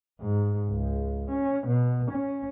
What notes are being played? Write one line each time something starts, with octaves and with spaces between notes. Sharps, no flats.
G#2
C#2
C#4
B2
C#4